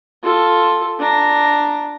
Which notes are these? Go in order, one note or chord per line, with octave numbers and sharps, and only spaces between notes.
F4 A4
D4 A#5